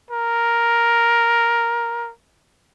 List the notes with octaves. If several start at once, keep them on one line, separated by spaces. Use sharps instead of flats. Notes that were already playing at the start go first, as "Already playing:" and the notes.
A#4